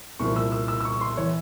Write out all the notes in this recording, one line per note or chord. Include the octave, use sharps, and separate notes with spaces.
C2 A#2 F3 C#6
E6
E6
E6
E6
C#6
C6
E3 C#5